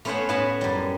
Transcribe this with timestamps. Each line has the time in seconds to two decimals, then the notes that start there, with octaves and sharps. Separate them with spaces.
0.05 A3 B3 C#4 C5 C#5 F#5
0.29 A2 B3 F#5 G#5 A5
0.61 F#2 G3